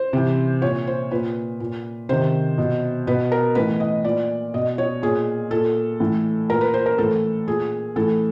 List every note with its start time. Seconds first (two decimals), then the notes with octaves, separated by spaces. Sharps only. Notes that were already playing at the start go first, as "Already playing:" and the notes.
Already playing: C5
0.13 C3 E3
0.62 A#2 C#5
0.87 C5
1.11 A#2 B4
1.60 A#2
2.09 C3 D#3 C5
2.58 B2
3.07 B2 B4
3.32 A#4
3.55 A2 E3 B4
3.80 D#5
4.05 A#2 D5
4.54 B2 D#5
4.78 C#5
5.02 A#2 G#4
5.51 A#2 A4
6.00 A2 E3
6.49 A#2 A#4
6.61 B4
6.74 C5
6.86 A#4
6.98 A2 E3 A4
7.47 A#2 G#4
7.96 A2 E3 A4